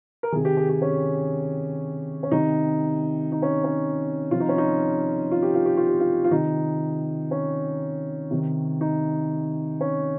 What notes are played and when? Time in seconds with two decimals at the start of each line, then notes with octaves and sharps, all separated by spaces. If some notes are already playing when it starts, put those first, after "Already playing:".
0.23 A#4
0.32 C3 D#3 G#4
0.45 G4
0.57 G#4
0.69 G4
0.82 C#4
2.23 C#4
2.32 C3 D#3 D#4
3.32 D#4
3.42 C#4
3.64 C#4
4.31 C3 F3 F4
4.40 D#4
4.49 C#4
4.58 D#4
5.32 F4
5.42 G4
5.54 F4
5.66 G4
5.77 F4
5.89 G4
6.00 F4
6.24 F4
6.31 C3 D#3 D#4
7.31 C#4
8.31 C3 D#3
8.81 D#4
9.81 C#4